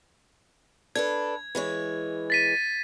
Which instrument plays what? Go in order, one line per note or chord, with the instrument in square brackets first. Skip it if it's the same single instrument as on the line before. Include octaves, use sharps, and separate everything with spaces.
[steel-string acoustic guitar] D4 A4 B4 [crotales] G#6
[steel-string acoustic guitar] E3 G#3 C#5
[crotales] A6 B6 D#7